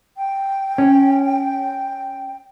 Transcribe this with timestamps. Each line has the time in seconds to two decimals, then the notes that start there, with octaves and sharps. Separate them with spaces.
0.16 G5
0.78 C#4